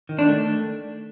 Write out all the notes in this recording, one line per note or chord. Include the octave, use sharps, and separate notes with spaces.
D#3
D4
A3